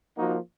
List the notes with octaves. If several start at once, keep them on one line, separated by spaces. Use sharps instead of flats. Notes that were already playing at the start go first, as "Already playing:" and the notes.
F3 A#3 D#4 F#4